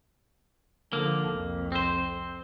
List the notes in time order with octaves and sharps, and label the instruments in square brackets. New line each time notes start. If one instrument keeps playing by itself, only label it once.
[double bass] D3 F3 [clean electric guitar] A#3
[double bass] C2 F2
[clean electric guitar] C4 C5